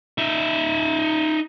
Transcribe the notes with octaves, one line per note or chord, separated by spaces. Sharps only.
D#4 E5